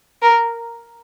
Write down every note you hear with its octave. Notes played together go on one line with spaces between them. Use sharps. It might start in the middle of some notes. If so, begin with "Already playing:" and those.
A#4